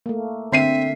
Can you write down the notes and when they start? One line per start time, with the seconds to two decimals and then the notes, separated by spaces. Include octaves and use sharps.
0.06 A3 A#3
0.52 D3 C4 E5 C7 D#7